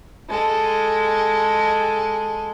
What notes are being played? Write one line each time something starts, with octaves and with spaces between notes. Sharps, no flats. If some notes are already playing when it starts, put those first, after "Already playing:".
G#3 A4